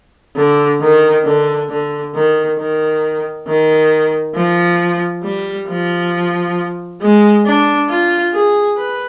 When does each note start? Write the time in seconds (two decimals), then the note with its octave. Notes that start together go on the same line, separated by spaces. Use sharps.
0.36 D3
0.80 D#3
1.24 D3
1.69 D3
2.14 D#3
2.58 D#3
3.47 D#3
4.35 F3
5.23 G3
5.68 F3
7.01 G#3
7.45 D4
7.89 F4
8.33 G#4
8.78 B4